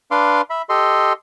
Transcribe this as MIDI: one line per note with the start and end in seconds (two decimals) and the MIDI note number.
0.11 0.41 62
0.11 0.41 71
0.11 0.41 77
0.11 0.41 84
0.11 0.41 86
0.50 0.62 76
0.50 0.62 83
0.69 1.13 67
0.69 1.13 69
0.69 1.13 75
0.69 1.13 84